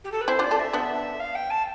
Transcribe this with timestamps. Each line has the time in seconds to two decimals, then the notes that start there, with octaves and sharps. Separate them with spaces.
0.04 G4
0.11 A4
0.20 B4
0.27 C4 E4 C5
0.39 D4 F4
0.43 D5
0.51 F4 A4
0.59 E5
0.73 B3 D4
1.19 F5
1.34 G5
1.50 A5